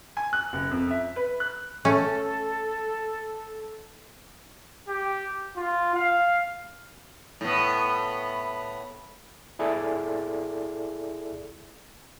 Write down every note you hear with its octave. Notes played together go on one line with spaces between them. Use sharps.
G#5
F#6
F#1
F2
E5
B4
F#6
A3 C#4 A4
G4
F4
F5
A2 B3
E4 G#4 A4 D5 E5